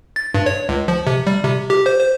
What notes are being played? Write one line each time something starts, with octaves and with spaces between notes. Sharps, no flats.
A6
G2
C#5
C#2
F3
C3
G3
C3
G4
C5
C5